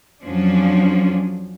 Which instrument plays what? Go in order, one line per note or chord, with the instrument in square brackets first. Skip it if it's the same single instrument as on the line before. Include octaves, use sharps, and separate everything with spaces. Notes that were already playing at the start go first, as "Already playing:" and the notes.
[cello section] F2 F3 F#3 C#4 D4